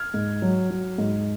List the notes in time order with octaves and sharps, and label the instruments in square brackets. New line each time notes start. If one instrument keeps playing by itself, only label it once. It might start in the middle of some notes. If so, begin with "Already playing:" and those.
Already playing: [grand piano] F6 G#6
G#2
F#3
F#3
G#2